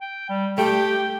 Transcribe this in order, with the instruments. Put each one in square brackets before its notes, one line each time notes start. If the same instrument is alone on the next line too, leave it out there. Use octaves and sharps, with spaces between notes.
[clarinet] G5
G3
[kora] A3 [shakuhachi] G4 [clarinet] G5